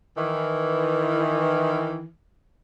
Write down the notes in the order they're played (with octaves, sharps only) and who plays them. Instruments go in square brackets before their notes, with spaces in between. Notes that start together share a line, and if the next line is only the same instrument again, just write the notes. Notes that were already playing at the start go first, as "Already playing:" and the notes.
[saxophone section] D#3 E3